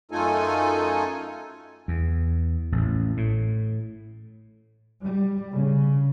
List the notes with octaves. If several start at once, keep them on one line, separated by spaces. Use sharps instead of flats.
F#2 A3 D#4 F4 A4 G#5
E2
A1
A2
G3
C#3